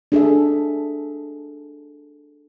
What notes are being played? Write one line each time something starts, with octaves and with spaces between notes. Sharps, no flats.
D4 G#4 A4 E5